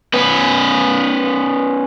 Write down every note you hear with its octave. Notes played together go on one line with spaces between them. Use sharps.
B3 C#4 B4